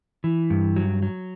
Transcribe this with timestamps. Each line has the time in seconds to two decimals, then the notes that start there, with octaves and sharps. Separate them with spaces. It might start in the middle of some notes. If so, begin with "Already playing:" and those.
0.24 E3
0.50 G2
0.76 F#3
1.03 F#3